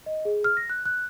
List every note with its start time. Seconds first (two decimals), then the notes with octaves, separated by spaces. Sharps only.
0.06 D#5
0.25 G#4
0.44 F6
0.57 A#6
0.70 F#6
0.86 F#6